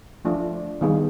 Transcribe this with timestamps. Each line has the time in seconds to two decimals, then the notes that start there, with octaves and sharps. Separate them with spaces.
0.25 F3 A3 D4 F4
0.81 D#3 G3 B3 D#4 G#4